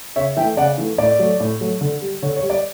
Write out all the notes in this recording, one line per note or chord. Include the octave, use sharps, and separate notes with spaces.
C#3 C#5 E5
E3 A3 E5 G5
C#3 D5 F#5
E3 A3
A2 D5
F#3 A3
A2
F#3 A3
D3
G3
D3 C#5
C#5
G3
D5